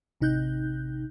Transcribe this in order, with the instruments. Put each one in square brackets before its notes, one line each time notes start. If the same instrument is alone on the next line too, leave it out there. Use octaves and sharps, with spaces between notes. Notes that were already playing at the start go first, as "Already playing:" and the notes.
[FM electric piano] A1 C3 D#4 F#6 G6